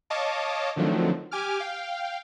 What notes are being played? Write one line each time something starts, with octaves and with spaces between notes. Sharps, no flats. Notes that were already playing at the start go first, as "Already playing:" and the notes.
C#5 D#5 F5 A5 D6
D3 D#3 F3 F#3 A3 C4
G4 G#5 D6 F6
F5 G5